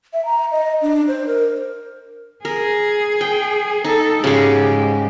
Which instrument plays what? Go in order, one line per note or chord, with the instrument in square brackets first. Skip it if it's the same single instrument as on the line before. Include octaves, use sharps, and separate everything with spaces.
[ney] E5
A#5
D#5
D4
C5
A#4
[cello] G#4 [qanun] A#4
[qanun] G5
[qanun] D#4 [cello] A4
[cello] G#2 G4 [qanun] C#3 G#3